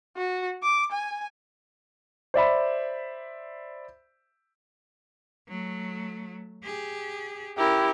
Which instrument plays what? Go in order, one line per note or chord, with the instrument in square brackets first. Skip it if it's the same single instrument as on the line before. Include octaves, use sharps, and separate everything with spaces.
[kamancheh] F#4
D6
G#5
[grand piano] C5 D5 E5 B5
[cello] F#3 A3
G4 G#4
[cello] C#4 A#4 [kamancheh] E4 G4